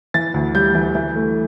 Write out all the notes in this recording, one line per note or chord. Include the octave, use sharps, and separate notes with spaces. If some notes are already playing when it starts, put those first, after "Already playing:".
E3 A6
D2
G3 G6
E3
E3
A3